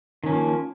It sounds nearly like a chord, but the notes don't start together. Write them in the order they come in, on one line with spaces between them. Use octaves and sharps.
D#3 C#4 F3 A#3